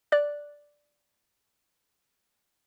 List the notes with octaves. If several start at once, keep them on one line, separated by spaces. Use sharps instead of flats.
D5 F#6